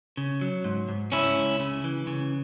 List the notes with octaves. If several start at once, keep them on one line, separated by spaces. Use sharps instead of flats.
C#3
F#3
G#2
G#2
C#2 C#4 E4
C#2
C#3
E3
C#3